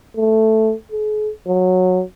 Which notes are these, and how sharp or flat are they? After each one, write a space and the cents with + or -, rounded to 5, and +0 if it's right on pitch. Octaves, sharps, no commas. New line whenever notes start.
A3 +0
G#4 +45
F#3 -15